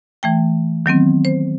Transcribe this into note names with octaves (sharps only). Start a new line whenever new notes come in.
E3 A3 G5
D#3 F#3 B3 C4
C5